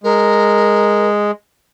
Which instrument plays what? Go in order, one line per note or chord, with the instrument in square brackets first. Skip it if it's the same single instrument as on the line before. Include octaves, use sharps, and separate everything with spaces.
[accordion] G#3 [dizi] A#4